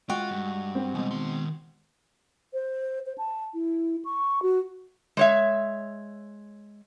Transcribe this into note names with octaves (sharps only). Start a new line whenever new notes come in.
G#3 F4 F#4 G5
G2
C4
B2 E3 G3 G#3
D#3 C6
C5
C5
A5
E4
C#6
F#4
G#3 C#5 E5